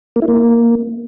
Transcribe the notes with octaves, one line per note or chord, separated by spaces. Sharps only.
A#3
E4
A#3